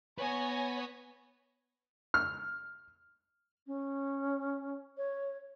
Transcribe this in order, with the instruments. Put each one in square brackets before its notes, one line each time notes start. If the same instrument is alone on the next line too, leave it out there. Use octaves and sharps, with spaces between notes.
[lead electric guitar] B3 B4 [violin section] C#5 G#5 A#6
[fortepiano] F6
[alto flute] C#4
C#5